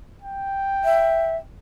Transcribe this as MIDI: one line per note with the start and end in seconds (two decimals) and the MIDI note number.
0.22 1.43 79
0.84 1.37 76